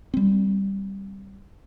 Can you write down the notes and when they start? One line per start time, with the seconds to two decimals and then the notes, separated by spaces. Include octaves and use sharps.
0.14 G3 C4